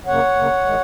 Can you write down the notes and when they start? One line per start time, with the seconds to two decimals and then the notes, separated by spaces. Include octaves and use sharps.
0.06 F#2 C#3 A#3 C#5 F#5
0.36 F#2 C#3 A#3
0.65 D#3 G#3